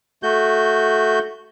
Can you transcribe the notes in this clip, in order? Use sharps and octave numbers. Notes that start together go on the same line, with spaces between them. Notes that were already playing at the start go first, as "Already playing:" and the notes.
A3 F#4 G6